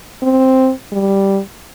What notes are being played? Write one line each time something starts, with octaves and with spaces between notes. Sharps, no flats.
C4
G3